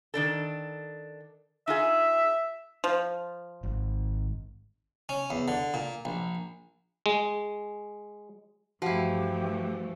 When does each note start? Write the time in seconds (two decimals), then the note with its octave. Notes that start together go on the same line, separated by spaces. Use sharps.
0.14 D#3 D4 A4
1.68 D#4 F4 G#4 E5
2.84 F3
3.63 G#1
5.09 C#4
5.30 E2
5.48 D3
5.74 A#2
6.05 A#1
7.06 G#3
8.82 G2 E3 F3 A3 E4 F#4 G4 F#5